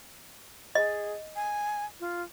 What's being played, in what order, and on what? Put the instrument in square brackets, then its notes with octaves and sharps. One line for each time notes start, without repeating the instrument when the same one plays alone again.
[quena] G#4 [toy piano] D#5
[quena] G#5
F4